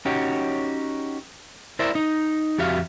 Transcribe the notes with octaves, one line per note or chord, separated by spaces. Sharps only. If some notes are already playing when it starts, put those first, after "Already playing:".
C#4 D#4 F#4 G4 C#5
E4 A#4 C5 D5 E5
D#4
F2 F#4 G4 E5 F5